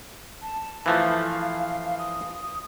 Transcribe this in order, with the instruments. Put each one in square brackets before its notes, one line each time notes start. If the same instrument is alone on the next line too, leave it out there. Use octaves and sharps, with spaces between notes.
[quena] A5
[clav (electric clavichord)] E3 F3 A3 [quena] F5
[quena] D#6